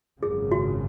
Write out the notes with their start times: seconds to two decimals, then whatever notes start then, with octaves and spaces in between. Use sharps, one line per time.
0.23 G#1 F#2 C#3 G#4
0.52 F#4